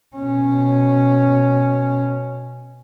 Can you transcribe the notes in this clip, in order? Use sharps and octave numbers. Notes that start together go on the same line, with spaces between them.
B2 C#4